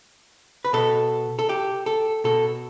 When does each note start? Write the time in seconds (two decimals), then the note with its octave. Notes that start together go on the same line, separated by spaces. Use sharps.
0.65 B4
0.73 B2 A4
1.39 A4
1.49 G4
1.86 A4
2.24 B2 A4